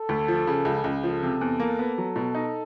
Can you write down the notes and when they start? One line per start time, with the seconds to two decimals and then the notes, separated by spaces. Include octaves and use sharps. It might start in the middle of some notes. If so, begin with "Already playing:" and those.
Already playing: A4
0.09 D2
0.28 F3
0.47 C#3
0.65 C#2
0.84 C#2
1.03 F3 A4
1.23 C3
1.41 E2
1.60 A#3
1.79 B3
1.98 F#3
2.16 B2
2.35 D#4